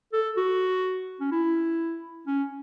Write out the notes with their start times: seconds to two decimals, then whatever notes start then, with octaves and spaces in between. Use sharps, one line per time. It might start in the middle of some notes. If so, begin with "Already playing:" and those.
0.13 A4
0.37 F#4
1.21 C#4
1.32 E4
2.27 C#4